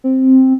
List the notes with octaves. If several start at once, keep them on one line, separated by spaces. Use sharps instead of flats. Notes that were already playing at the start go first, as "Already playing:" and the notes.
C4